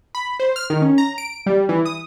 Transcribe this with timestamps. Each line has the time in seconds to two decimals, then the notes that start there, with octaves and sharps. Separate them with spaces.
0.15 B5
0.40 C5
0.56 F6
0.70 D#3
0.82 C#4
0.98 A#5
1.18 D7
1.46 G3
1.69 E3
1.85 D#6